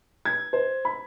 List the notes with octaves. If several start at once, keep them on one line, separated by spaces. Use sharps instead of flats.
G#6
C5
B5